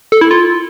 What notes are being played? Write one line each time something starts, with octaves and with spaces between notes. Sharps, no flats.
A4
E4
F4